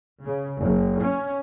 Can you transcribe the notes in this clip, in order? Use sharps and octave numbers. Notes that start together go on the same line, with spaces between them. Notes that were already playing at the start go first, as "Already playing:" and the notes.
C#3
F#1
C#4